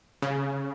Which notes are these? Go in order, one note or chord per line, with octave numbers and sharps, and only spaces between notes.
C#3